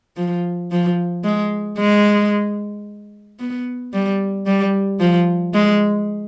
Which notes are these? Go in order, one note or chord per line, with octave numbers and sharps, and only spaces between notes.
F3
F3
G#3
G#3
B3
G3
G3
F3
G#3